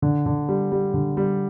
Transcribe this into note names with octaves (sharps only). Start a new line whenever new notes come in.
D3
D3
G3
G3
D3
G3